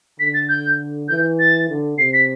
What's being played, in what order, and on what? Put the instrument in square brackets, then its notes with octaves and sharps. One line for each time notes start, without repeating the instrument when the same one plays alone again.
[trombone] D3 [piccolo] B6
[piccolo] A6
G6
[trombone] E3 [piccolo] G6
[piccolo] A6
[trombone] D3
[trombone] C3 [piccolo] C7
[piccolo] B6